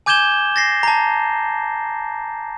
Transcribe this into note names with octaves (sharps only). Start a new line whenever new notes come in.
G#5 D6 G6 G#6 E7 G7
A6 A#6 C7
A5 A#5